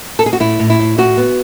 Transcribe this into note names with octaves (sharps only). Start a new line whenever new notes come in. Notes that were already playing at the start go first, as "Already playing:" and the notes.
A4
G#4
F#4
A2 E4
A2
E4
A2
A2 F#4
B3